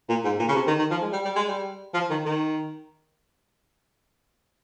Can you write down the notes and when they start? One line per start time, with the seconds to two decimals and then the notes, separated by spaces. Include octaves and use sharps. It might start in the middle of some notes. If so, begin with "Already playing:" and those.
0.09 A#2
0.24 G#2
0.39 A#2
0.49 C#3
0.55 C3
0.67 D#3
0.78 D#3
0.91 F3
1.01 G#3
1.12 G3
1.25 G3
1.36 G#3
1.48 G3
1.94 F3
2.10 D#3
2.25 D#3